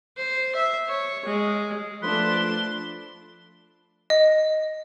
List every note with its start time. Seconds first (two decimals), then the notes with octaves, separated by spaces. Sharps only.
0.17 C5
0.56 E5
0.88 C#5
1.25 G#3
2.02 F3 A3 D4 B4 C6
4.10 D#5